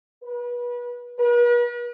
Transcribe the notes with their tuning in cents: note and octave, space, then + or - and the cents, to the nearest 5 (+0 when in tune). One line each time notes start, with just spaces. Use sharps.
B4 -30
B4 -45